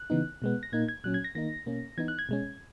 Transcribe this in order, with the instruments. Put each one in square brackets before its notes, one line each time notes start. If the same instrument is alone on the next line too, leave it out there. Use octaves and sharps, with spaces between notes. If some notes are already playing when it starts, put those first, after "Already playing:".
Already playing: [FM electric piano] F#6
C#3 E3 B3 D#4
B2 G#3 B3
A#6
A#2 A#3 D#4 G#6
G#6
A#2 F#3 C#4 F#6
G#6
A#6
D#3 A#3 D#4 A#6
B2 A#3 C#4
E3 B3 D#4 G#6
F#6
G#6
B2 G#3 C#4